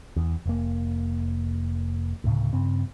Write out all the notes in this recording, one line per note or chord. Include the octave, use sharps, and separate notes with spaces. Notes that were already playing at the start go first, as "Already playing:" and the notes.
E2
F1 A#3
D2 A2 C#3
G2 C#3 C4